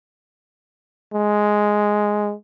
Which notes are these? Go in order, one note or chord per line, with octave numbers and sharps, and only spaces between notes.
G#3